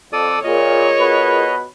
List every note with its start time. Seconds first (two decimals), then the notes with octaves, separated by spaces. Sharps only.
0.13 F2 A4 D5 D#6
0.44 A#2 F4 G#4 A#4 C#5 D#5
0.99 B2 B4